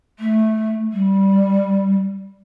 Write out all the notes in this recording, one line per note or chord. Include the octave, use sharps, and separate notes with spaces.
A3
G3